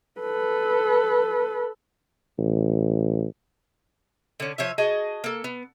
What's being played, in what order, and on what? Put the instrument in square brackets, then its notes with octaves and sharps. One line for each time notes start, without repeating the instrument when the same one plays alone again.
[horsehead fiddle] A4 B4
[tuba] A1
[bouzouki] D3 C#4
F3 C#5 E5
F#4 G#4 D#5 A5
A#3 A4
B3